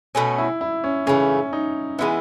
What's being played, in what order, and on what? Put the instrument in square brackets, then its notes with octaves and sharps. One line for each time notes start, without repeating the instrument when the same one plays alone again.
[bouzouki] B2 A3 C#4
[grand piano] E4
E4
C#4
[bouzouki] C#3 E3 A3 [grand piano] C#4
[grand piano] D#4
[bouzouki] E3 G#3 B3 [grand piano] E4